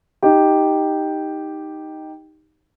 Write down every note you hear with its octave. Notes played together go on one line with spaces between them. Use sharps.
D#4 G4